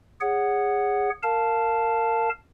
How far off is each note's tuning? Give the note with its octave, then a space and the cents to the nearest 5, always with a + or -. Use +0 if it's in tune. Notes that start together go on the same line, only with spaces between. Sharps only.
G#4 -20 C#5 +0 F#5 +0
A#4 -20 F5 +0 A5 +0